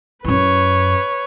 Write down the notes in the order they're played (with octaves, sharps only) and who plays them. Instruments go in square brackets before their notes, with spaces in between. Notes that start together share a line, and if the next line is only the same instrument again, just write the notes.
[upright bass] F#2 E4 [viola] B4 C#5